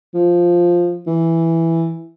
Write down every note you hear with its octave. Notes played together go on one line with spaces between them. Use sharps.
F3
E3